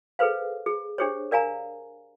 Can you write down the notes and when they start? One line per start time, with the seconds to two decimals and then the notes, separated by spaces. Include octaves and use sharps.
0.19 G#4 A4 B4 C5 F5
0.66 G#4
0.98 D4 G4 G#4 C5 C#5
1.31 A#4 D5 F5 G#5 A#5